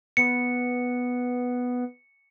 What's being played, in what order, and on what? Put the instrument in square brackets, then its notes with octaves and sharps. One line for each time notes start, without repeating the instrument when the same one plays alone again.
[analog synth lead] B3 [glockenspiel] C#7